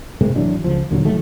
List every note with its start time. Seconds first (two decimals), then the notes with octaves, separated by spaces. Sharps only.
0.21 A2 C3 G#3 A#3
0.35 G#1 E3 F#3 D4
0.64 C#2 F3
0.91 D#2 A#2 D3 F#3
1.05 C2 D#3 F#3 A3